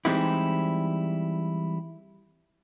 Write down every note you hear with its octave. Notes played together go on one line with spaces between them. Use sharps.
E3 G3 G#3 C4 D#4 E4